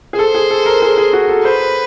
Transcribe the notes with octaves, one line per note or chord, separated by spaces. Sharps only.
G#4
A4 C5
G#4
A4
A#4
G#4
G#4
F#4
A4
B4 C5